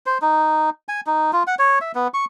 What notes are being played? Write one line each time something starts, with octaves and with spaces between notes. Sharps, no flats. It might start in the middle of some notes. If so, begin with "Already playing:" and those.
C5
D#4
G#5
D#4
F4
F#5
C#5
E5
B3
C#6